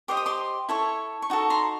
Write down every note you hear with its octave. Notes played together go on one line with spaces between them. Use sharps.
G4 C5 D#5 D6
D#6
C6 D6
E4 A4 C#5
C#6
D#4 F#4 A4
A#5 C6